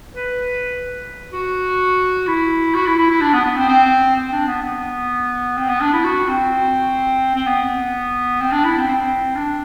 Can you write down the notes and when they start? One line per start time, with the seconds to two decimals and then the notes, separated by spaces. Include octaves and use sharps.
0.14 B4
1.33 F#4
2.27 E4
2.75 F#4
2.87 E4
2.98 E4
3.10 E4
3.21 D4
3.33 B3
3.45 B3
3.57 C4
3.69 C4
4.16 C4
4.32 D4
4.47 B3
4.63 B3
5.58 C4
5.69 B3
5.81 D4
5.93 E4
6.04 F#4
6.29 C4
7.35 C4
7.47 B3
8.41 C4
8.52 D4
8.65 E4
8.77 C4
8.89 C4
9.36 D4